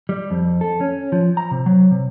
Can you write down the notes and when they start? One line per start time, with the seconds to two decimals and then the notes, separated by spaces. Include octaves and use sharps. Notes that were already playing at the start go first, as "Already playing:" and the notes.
0.09 G3
0.31 F2
0.61 A4
0.81 C#4
1.12 F3
1.37 A#5
1.51 C3
1.66 F#3
1.91 C3